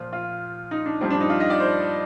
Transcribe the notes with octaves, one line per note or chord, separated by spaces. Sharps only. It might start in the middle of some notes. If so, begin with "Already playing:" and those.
Already playing: A#2 F3 F4
F4
D#4
D4
G2 F3 C4
D4
D#4
F4
D#5
D5
C5